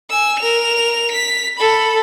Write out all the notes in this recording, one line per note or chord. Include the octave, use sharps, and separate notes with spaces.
G#5 E6
A#4 F7
B6
A4 B5